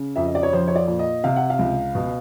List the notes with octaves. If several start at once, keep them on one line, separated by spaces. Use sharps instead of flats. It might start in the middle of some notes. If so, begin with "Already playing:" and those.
Already playing: C#3
F2 E5
D#5
D5
C#5
F3 C5
C#5
D5
A#2
D#5
C3 F5
F#5
F5
C#2
B2